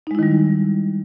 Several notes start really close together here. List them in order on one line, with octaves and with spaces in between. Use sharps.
D#4 G#3 E4 D#3 G3